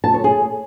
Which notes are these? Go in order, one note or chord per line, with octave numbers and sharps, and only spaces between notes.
A5
C#5
G#4